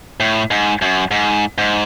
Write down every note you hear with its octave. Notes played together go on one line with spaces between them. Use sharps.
A2
G#2
F#2
G#2
G#2